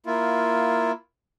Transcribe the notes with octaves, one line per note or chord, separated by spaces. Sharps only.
A#3 E4 F4